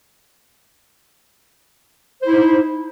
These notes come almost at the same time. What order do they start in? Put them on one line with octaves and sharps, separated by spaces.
C5 E4 D#4